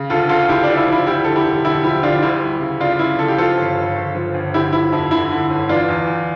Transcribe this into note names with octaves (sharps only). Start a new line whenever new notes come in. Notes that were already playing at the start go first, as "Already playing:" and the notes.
Already playing: C#3
D2 F4 A4
D2 F4 A4
D2 E4 G4
D4 F4
D2
E4
F3
E4
D2 E4 G4
D3 A4
E4 G4
E1
D3 E4 G4
F3 E4 G4
D3 D4 F4
D2 E4 G4
G3
C#3
C#3 D4 F4
C#3 E4
C#3 A4
G4
F3 F4 A4
G1
G1
G1
F3
G1
D3 E4 G4
F3 E4
F2 E4
D3 E4
D3
G1
E3 D4 F4
E2
E2